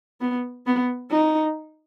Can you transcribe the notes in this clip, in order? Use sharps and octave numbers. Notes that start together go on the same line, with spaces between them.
B3
B3
D#4